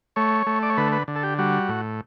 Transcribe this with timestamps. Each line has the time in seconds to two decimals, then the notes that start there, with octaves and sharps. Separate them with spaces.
0.16 A3 C#5
0.47 A3
0.63 D5
0.70 C#5
0.77 D3 B4
0.92 B4
1.08 D3
1.15 A4
1.23 G4
1.38 G3 F#4
1.69 A2